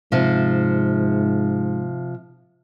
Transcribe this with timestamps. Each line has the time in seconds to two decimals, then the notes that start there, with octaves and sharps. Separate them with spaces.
0.12 G#2 C3 F3